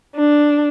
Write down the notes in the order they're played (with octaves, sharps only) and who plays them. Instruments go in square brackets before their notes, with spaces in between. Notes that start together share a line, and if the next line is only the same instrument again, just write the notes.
[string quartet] D4